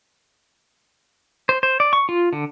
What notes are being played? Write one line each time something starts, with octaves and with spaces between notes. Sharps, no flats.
C5
C5
D5
C#6
F4
D3